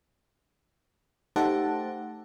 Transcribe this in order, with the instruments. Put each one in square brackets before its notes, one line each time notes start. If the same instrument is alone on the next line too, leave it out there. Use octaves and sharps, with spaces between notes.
[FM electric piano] A3 D#4 G4 C5 F#5 A5